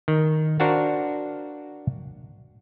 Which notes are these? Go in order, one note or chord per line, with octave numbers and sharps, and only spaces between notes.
D#3
D4 F#4 A#4 C5 F5 F#5